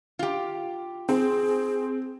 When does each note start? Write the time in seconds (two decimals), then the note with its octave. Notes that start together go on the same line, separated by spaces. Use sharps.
0.19 F4 G4
1.09 C4 G#4